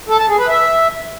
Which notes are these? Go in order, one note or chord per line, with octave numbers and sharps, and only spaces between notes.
A4
A5
G#4
B4
E5